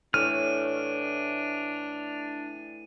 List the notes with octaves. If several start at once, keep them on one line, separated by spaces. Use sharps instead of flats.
A2 E3 D4 C#5 F6 D#7